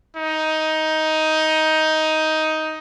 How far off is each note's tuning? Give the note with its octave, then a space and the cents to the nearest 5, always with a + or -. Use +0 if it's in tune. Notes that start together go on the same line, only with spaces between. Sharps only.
D#4 +10